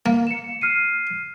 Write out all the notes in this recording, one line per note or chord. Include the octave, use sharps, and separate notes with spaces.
A#3
C#7 E7
F6 C7 D#7